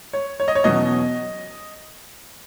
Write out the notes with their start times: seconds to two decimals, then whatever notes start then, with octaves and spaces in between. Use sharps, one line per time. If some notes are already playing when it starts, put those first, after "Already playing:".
0.13 C#5
0.40 C#5
0.48 D#5
0.55 C#5
0.64 E2 B2 F#3 C#4 D#5